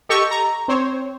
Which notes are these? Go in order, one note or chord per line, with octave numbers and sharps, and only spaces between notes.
G4 A4 D#5 C#6
A#5
C4 C5 C#5